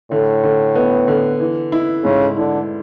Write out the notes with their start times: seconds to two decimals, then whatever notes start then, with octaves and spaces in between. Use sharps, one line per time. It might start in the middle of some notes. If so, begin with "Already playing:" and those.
0.11 A2 D3
0.44 D3
0.75 B3
1.08 D3
1.40 E3
1.72 E4
2.04 G#2 C#3
2.37 D3 E4